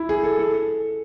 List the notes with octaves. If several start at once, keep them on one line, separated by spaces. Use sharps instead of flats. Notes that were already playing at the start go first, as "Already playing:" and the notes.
Already playing: E4
G#4
A4
A4